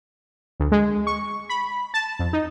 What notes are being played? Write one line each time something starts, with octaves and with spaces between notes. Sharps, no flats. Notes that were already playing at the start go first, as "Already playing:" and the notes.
D2
G#3
C#6
B5
A5
F2
D#4